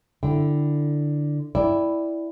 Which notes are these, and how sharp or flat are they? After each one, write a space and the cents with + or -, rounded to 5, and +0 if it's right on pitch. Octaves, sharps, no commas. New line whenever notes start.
D3 +5 E4 +0 G5 +0
E4 +0 D5 +0 G5 +15